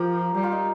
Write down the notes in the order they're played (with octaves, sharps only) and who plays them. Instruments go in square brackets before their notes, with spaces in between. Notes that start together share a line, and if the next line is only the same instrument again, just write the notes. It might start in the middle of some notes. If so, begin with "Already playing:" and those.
Already playing: [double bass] F3 [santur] F4 G4 A#4
[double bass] G3 [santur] G4
[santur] F4
D#4